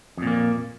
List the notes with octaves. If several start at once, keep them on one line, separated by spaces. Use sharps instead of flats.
F2 A#2 A#3